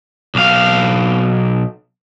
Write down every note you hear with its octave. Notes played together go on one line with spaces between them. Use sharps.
B1 F5